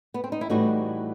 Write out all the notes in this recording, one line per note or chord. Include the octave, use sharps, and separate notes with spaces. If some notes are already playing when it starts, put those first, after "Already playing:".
B3
C4
D#4
E4
A2 E3 G3 D#4 F#4